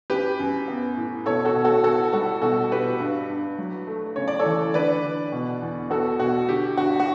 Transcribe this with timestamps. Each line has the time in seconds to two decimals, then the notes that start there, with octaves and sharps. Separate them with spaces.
0.10 F#2 G4 B4
0.40 F#2
0.68 B3
0.97 A2
1.26 B2 A4 C#5
1.45 F#4 A4
1.56 B2
1.64 F#4 A4
1.84 B3 F#4 A4
2.13 G3 F#4 A4
2.42 B2 F#4 A4
2.71 B2 G4 B4
3.00 G2
3.30 G2
3.58 F#3
3.87 A3
4.16 C#3 C#5
4.28 D5
4.39 A4 C#5
4.45 E3
4.74 D3 B4 D5
5.03 D3
5.32 B2
5.62 E2
5.90 B3 F#4 A4
6.19 B2 F#4
6.49 D3 G4
6.77 G2 F#4
7.00 F#4